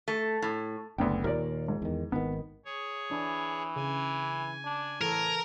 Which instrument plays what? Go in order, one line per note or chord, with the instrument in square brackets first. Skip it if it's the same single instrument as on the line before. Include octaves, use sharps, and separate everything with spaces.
[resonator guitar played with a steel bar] A3
A2
[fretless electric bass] F#1 [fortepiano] D2 B3 G5
[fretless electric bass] D#2 A#2 [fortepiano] A#4 C#5 D5
[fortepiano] G#2
[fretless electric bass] E2 D#3
[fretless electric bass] G#1 D#3 [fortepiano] B3
[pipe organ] G#4 C#5
[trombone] E3 [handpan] D4
[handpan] C#3 [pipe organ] G#5
[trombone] D4
[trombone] A2 [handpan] E3 A4 [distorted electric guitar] A#4